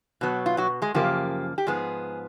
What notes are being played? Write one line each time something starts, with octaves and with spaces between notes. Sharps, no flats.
B2 F#3 B3
F4
F#3 F#4
G#3 G#4
F#2 C#3 F3 A#3 G4
G4
G#2 F3 G#3 B3 G#4